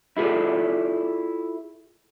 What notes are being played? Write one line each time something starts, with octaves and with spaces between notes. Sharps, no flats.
E4 F4 G#4 A4 D5